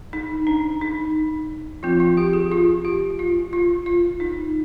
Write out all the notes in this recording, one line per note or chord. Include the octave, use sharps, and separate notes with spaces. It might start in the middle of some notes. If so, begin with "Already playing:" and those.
D#4
D4
D#4
F3 C4 F4
F4
G4
G#4
F4
G4
F4
F4
F4
D#4